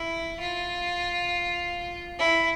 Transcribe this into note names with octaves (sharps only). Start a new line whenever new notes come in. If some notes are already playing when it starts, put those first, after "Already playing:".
Already playing: E4
F4
E4